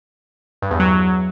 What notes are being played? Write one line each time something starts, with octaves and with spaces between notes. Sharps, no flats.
G2
E2
F#3